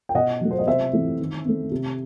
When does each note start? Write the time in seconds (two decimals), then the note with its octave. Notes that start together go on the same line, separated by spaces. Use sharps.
0.09 G5
0.15 B2 D#5 F#5
0.41 F#3 A3
0.51 C5
0.59 D#5
0.67 C3 C5 E5
0.93 E3 A3 C4
1.19 D#3
1.45 A3 C4
1.72 C3